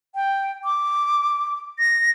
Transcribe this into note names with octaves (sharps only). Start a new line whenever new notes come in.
G5
D6
A#6